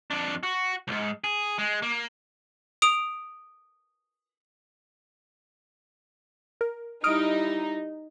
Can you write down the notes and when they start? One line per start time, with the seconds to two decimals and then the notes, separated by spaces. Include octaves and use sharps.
0.11 F2 D4
0.43 F#4
0.88 C2 G#2
1.24 G#4
1.58 G#3
1.82 A#3
2.82 D#6 D7 F7
6.61 A#4
7.04 G3 D#4 E4 D#6 F6 D7